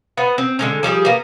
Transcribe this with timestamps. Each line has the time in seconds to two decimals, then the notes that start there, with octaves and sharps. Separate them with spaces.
0.17 B3 C5 F#5
0.38 C4
0.59 D3 G#3 C#4
0.83 F3 G3 G4 G#4
1.05 A#3 B3